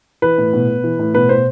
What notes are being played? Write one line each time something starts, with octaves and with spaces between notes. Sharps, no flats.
E3 B4
A2
B2
B2
E3
A2
B2 B4
B2 C5